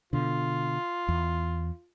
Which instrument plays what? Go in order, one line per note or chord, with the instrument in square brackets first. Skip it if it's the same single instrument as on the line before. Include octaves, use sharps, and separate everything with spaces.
[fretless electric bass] B2 D3 [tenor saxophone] F4
[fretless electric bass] E2